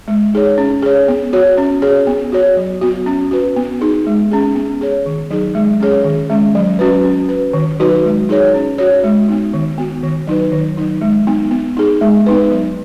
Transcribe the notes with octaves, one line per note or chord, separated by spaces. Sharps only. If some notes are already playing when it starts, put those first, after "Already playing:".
G#3
D#4 G#4 C#5
C#4
G#4 C#5
B3
F#4 C#5
C#4
G#4 C#5
B3
F#4 C#5
F#3
B3 F#4
C#4
F#4 B4
B3
D#4 G#4
G#3
C#4 G#4
B3
G#4 C#5
D#3
F#3 D#4 G#4
G#3
C#4 G#4 C#5
D#3
G#3 C#4
F#3
C#4 F#4 B4
C#4
B4
D#3
F#3 D#4 F#4 B4
G#3
D#4 G#4 C#5
C#4
F#4 C#5
G#3
B3 D#4
D#3
B3 F#4
D#3
F#3 D#4 B4
D#3
F#3 D#4
G#3
B3 D#4
B3
D#4 G#4
G#3
B3 D#4 B4
F#3